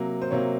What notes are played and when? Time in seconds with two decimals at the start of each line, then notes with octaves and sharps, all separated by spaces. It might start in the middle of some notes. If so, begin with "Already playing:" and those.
Already playing: C3 F#3 A#3
0.22 C5
0.31 C3 F#3 A#3 C#5